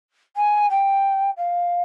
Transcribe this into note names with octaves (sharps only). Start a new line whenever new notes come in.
G#5
G5
F5